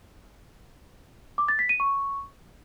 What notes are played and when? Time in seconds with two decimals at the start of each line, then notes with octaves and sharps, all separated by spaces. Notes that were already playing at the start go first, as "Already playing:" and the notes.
1.38 D6
1.48 A6
1.59 B6
1.69 D#7
1.80 C#6